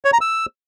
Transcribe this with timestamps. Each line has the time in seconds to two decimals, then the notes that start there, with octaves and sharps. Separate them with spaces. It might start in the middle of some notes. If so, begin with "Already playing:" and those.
0.05 C#5
0.13 A#5
0.21 E6